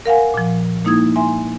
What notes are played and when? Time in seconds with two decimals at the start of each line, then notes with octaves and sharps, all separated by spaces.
0.06 A#4 F5 F#5 G#5
0.34 A#2 F3
0.85 G#3 A#3 D#4 E4 D#6 G#6
1.15 E5 G#5 C6